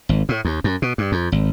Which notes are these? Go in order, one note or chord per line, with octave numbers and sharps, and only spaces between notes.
G#1
A2
D#2
F#2
B2
G2
F2
G#1